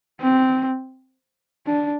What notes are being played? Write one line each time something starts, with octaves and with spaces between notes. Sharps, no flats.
C4
D4